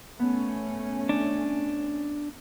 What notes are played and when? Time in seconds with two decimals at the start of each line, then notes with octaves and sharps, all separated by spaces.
0.19 A3 B3 C#4
1.09 D4